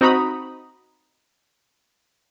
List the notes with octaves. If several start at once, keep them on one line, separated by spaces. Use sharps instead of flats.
C4 D#4 F#4 A#5 B5 D#6